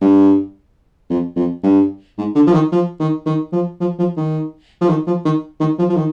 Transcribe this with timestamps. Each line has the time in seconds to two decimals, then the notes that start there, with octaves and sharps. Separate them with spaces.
0.01 G2
1.10 F2
1.36 F2
1.63 G2
2.18 G#2
2.35 D3
2.47 F3
2.53 D#3
2.72 F3
2.99 D#3
3.26 D#3
3.53 F3
3.80 F3
3.98 F3
4.17 D#3
4.81 F3
4.89 D#3
5.07 F3
5.25 D#3
5.60 D#3
5.79 F3
5.89 F3
5.96 D#3